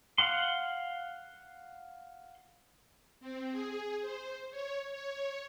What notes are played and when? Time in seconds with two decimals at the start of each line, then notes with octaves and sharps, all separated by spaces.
0.18 F5 F#5 C6
3.21 C4
3.52 G#4
4.02 C5
4.51 C#5
4.91 C#5